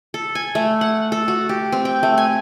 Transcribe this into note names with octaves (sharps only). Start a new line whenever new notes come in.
A4
G#5
A3
F#5
A4
F#4
G4
C4
G5
A3
G#5